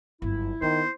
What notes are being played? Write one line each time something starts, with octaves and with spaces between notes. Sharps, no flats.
G1 F#2 E4
D#3 B3 C5